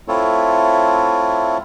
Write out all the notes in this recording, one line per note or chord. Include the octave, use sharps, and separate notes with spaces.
A3 C4 E4 F4 A4 C#5